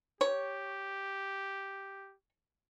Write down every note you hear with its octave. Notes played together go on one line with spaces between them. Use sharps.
G4 C#5